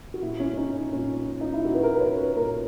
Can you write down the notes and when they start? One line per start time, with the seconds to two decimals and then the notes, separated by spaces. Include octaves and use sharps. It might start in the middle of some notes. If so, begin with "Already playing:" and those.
0.14 F#4
0.22 A#2 E4
0.40 C#4
0.54 C#4
0.57 D#4
0.93 A#2 C#4
1.17 C#4
1.41 D#4
1.54 E4
1.65 A#2 F#4
1.75 B4
1.83 A#4
1.96 B4
2.01 C#5
2.18 B4
2.36 A#2 A#4
2.49 A#4